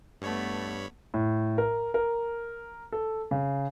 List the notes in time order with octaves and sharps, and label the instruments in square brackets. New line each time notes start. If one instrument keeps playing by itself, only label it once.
[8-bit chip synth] G2 C#5 B5 [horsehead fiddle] A3 B3
[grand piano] A2
A#4
A#4
A4
C#3